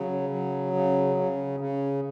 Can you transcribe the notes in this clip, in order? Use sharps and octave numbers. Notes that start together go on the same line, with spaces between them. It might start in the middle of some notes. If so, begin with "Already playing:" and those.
Already playing: C#3 F#3
F#3
C#3
C#3
C#3